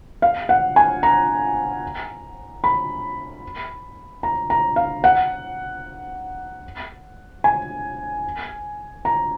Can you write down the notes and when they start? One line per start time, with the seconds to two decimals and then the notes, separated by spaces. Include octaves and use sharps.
0.22 F5
0.49 F#5
0.76 G#5
1.03 A#5
2.64 B5
4.23 A#5
4.50 A#5
4.76 F5
5.04 F#5
7.44 G#5
9.05 A#5